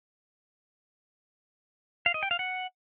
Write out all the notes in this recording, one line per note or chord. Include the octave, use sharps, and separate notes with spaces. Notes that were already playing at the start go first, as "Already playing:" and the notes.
F5
D#5
G5
F5
F#5